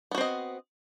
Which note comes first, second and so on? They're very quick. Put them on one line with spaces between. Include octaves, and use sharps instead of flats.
B3 F#4 C4 D#5